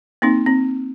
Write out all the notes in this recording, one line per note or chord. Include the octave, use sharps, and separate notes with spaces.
A#3 C4 D#4
C4